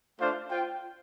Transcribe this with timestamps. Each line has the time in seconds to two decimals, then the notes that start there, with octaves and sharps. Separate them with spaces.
0.19 A3 D4 F4 C5 F5
0.49 F4 C5 G5